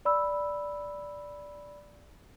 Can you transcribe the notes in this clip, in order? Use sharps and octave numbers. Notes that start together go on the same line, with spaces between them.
D5 B5 E6